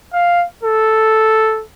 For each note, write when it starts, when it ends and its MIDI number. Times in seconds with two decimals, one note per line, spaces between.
0.13 0.45 77
0.63 1.63 69